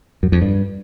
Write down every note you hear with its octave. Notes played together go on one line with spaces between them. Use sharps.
F#2
F2
G2